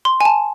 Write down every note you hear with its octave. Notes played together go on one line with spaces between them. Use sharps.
C6
G#5
A5